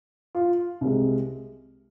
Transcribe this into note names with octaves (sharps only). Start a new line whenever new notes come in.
F4
C2 C3 G#3